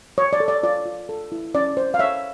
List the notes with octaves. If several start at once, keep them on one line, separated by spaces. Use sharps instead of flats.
C#5
D5
A4
D5
F4 D5
F4
A4
E4
C#4 D5
C5
F5
C#5 E5